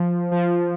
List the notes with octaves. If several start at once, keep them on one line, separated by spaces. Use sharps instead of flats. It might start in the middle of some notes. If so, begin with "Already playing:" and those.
Already playing: F3
F3